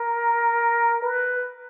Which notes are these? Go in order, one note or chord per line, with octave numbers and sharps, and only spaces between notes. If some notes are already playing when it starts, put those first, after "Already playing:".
Already playing: A#4
B4